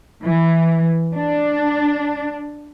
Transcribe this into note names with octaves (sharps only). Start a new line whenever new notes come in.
E3
D4